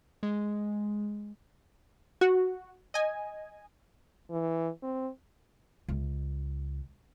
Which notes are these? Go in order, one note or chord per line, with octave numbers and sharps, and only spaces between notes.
G#3
F#4
D#5 G#5
E3
C4
C#2